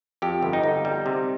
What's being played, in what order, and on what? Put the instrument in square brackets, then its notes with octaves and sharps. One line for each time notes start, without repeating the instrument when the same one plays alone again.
[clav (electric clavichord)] F2 G4
G1
D#4
G1
G3
C3